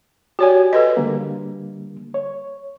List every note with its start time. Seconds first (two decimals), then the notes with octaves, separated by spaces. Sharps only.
0.39 F#4 G4 C#5 D5 G#5
0.73 A4 B4 D#5
0.97 D3 G3 A#3
2.14 C#5